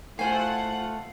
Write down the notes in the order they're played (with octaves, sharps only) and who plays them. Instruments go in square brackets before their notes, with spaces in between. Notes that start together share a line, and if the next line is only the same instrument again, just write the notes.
[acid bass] A3 [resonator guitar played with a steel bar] E4 C5 G#5 [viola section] F4 F#5 [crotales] C7